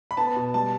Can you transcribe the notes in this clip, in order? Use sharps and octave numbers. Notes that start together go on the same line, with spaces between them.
B5
B3 A5
B2
G3 A5